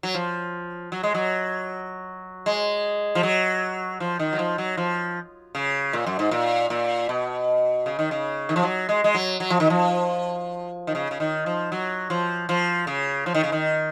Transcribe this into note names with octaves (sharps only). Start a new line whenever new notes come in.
F#3
F3
F#3
G#3
F#3
G#3
F3
F#3
F3
D#3
F#3
F3
F#3
F3
C#3
A#2
F#2
G#2
A#2
A#2
B2
C#3
D#3
C#3
D#3
F3
F#3
G#3
G#3
F#3
F#3
F3
D#3
F3
D#3
C#3
C#3
D#3
F3
F#3
F3
F3
C#3
F3
D#3
C#3
D#3